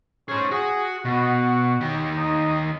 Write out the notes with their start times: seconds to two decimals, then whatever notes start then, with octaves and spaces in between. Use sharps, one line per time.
0.28 C#4 G#4 C5
0.51 F#4 G#4
1.05 B2 F#4
1.81 D#3 G4
2.18 D#4